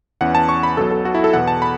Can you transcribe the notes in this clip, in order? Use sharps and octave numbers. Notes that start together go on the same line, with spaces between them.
E2 E3 C#4 F#5
A5
C#6
B5
B1 B2 F#3 A4
A4
F#4
E4
A4
E2 B2 B3 F#5
A5
B5